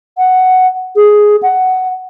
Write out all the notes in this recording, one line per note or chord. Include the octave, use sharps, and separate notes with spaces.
F#5
G#4
F#5